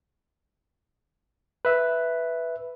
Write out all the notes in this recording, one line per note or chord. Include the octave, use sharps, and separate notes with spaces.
B4 E5